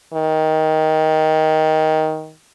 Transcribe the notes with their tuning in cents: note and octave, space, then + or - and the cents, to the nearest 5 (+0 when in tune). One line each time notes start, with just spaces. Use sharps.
D#3 +10